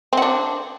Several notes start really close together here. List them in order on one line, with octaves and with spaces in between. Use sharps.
C4 F#4 D4